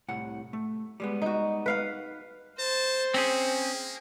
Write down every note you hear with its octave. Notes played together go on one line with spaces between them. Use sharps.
C2 A2 F#5
A3
G3 G#3 B3
D#4 F#4
B4 F5 F#5
C5 A5
A#3 C4 C#4 G#4